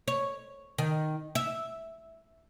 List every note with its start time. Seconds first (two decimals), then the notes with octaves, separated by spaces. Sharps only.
0.08 C#5
0.78 D#3
1.35 E5